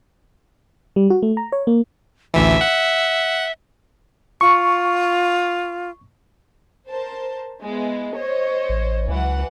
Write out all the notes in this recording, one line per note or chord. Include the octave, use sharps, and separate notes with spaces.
G3
F#4
A3
A#5
C#5
A#3
A1 D2 E3 E5
F#5
F4 C#6
A#4 C5 A5
G#3 B3 E4
C5 C#5 D#5
A1
C#2 E3 F#3 F#5